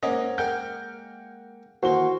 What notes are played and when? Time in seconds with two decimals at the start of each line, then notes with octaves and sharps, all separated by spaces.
0.03 G#2 A#3 C#4 D#5 F#5
0.38 G#3 A#3 A#4 F#5 G5 G6
1.83 D#2 E3 A#3 F#4 C5 G7